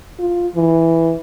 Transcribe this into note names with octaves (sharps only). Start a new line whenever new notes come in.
F4
E3